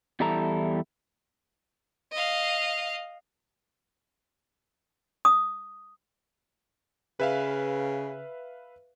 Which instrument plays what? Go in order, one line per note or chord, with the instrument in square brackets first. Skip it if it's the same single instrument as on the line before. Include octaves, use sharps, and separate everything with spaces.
[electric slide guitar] E2 G3 E4 A4 A#5
[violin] D#5 F5
[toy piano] D#6
[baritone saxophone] C#3 [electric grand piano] B4 E5 F5